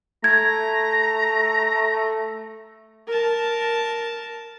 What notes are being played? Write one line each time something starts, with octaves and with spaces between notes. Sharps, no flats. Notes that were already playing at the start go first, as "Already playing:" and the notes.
A3 A#5 G#6
A#4 A5